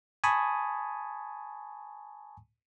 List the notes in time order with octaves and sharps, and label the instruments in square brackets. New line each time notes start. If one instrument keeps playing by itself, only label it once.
[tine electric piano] G#5 A5 B5 C#6 D#6